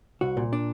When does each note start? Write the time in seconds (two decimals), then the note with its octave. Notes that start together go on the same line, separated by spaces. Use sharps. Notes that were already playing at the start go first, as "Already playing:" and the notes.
0.21 C2 F#4
0.37 A#2
0.53 D4